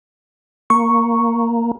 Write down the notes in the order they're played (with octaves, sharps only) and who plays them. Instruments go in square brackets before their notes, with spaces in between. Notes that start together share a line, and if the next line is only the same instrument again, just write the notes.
[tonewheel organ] A#3 [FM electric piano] C#6